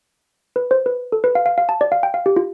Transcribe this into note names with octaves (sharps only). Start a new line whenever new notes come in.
B4
C5
B4
A4
B4
F5
F5
F5
A5
D5
F5
G5
F5
G4
F4